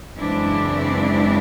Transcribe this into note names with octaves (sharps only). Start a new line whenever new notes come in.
F#2 C#3 E3 G#3 C4 D4 E4